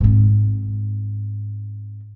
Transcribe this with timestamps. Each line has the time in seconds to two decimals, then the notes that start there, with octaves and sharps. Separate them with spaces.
0.01 G#2 C4